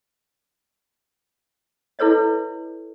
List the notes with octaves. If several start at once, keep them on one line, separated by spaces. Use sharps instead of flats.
E4 A4 B4 C#5 D#5